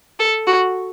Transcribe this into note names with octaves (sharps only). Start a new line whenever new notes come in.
A4
F#4